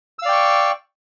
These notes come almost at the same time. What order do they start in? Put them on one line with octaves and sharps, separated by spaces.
E6 F5 D5 G5 C#6